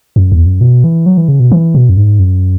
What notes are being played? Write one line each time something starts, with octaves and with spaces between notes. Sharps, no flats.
F#2
E2
F#2
B2
E3
F#3
E3
C#3
B2
E3
B2
F#2
G#2
F#2